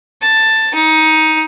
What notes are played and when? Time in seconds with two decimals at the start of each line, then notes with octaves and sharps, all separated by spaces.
0.21 A5
0.75 D#4